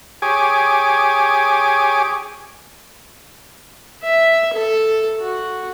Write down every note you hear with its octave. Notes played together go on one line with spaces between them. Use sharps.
G4 G#4 C#5 G#5 D6
E5
A4
F#4